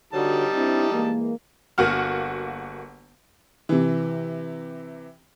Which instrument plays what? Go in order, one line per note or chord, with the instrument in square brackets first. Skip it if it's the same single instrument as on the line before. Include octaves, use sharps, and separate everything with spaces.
[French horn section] D3 F#4 C#5 [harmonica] G3 D#4 A5
[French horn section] C4 D4 E4
E3 G#3 A#3
[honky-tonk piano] G1 A#3 F#4 F#5 F6
C3 E3